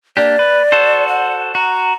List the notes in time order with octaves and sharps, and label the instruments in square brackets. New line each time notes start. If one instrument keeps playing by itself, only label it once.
[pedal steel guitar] A#3 D4 G4 [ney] D5
[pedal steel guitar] B4
F#4 A4 C5
[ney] F#5
[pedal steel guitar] F#4 [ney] A#5